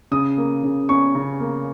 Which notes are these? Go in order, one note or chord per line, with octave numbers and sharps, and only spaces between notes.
C#3 D#6
A#3
C#3
C#4 C#6
C#3
A#3